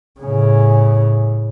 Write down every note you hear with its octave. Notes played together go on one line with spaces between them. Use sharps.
A2 C#3